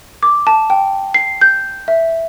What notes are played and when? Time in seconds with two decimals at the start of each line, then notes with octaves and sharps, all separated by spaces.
0.23 D6
0.47 A5
0.70 G5
1.14 C7
1.41 G6
1.88 E5